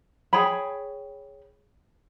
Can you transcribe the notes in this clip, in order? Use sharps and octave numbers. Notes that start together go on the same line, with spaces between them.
G#4 C#5 G5 B5